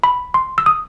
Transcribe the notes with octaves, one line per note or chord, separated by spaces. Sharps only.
B5
C6
E6
D#6